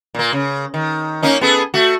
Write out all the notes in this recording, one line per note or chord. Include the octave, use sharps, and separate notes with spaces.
A#2 A#3
C#3
D#3
A#3 C#4 D#4
B3 G#4 A4
A3 F#4